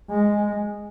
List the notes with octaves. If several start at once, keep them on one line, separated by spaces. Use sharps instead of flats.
G#3